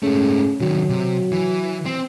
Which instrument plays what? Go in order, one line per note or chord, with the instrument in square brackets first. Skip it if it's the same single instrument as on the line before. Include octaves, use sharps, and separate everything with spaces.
[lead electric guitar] G#2 A3 [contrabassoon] C#3
[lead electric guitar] C3 D#3 [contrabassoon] F#3
[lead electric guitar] C3
E3
C4